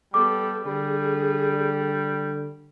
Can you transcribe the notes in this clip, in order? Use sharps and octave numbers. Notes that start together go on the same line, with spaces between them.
G3 B3 A4 D6
D3 G3 G#4